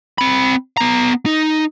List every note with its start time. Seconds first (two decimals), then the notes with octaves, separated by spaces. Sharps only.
0.18 C4 B5
0.77 B3 A#5
1.26 D#4